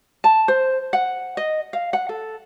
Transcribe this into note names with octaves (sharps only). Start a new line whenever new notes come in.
A5
C5
F#5
D#5
F5
F#5
A4